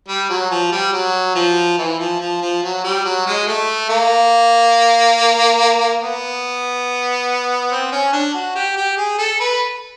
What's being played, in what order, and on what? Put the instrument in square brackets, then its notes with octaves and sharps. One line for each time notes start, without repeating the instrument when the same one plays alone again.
[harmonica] G3
F#3
F3
G3
F#3
F3
E3
F3
F3
F3
F#3
G3
F#3
G#3
A3
A#3
B3
C4
C#4
D4
F#4
G4
G4
G#4
A4
B4